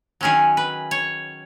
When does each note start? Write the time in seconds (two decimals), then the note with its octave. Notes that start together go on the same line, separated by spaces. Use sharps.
0.21 D#3 F#3 C#4 G#4
0.57 B4
0.91 C#5